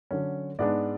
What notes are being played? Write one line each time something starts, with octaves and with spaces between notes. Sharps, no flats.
D3 F#3 C#4
G#2 G#3 B3 D4 D5